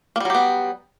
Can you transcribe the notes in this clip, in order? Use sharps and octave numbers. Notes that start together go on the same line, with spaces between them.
F#3 G3 A#3 B3 G4